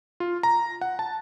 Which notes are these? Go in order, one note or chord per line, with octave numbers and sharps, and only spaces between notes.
F4
A#5
F#5
A5